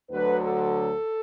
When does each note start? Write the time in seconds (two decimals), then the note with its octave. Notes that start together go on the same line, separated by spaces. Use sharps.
0.11 D2 D3 F#3 B4
0.40 A4